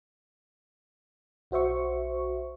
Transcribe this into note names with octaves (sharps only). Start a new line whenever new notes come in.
B1 F#4 C5 E5 C#6